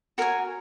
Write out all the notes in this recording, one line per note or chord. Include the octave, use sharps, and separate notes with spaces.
F#4 A#4 C#5 G#5